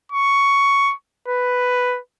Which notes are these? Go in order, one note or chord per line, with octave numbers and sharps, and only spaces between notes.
C#6
B4